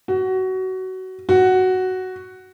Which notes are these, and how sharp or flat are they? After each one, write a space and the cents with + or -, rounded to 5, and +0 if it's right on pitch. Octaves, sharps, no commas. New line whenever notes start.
F#4 +20
F#4 +5